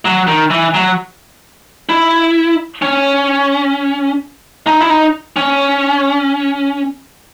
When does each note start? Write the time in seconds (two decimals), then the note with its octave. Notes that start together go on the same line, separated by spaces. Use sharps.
0.05 F#3
0.27 D#3
0.50 E3
0.74 F#3
1.89 E4
2.82 C#4
4.67 D#4
4.82 E4
4.90 D#4
5.36 C#4